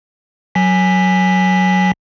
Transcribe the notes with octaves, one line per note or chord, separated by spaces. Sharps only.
F#3 G#5 B6